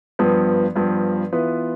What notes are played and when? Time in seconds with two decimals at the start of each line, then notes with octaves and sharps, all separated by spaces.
0.19 G2 F3 B3
0.75 G2 F3 B3
1.33 E3 B3 F4 B4